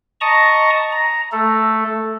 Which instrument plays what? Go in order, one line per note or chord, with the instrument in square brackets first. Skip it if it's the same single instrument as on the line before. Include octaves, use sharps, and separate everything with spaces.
[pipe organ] D#5 A5 A#5 C#6 D#6
A#5
A3 A4